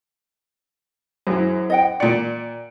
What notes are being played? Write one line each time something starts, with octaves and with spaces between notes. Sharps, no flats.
F#2 E4 G#4 C5
D#5 F#5 G5
A#2 D5 C#7 D7